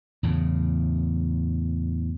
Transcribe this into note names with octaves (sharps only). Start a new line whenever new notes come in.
E2 A2 C#3